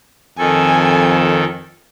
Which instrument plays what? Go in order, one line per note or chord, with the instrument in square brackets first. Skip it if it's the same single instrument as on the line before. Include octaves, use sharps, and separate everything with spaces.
[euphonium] F2 [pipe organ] D#3 A4 [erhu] G#5